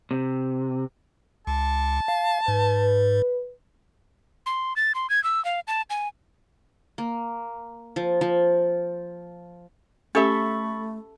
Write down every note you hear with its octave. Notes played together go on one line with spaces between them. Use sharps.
C3
C#2 A5
F5
G#2 B4
C6
A6
C6
G#6
E6
F5
A5
G#5
A#3
F3
F3
A3 C#4 G4 A4 E5 B5 C#6 A6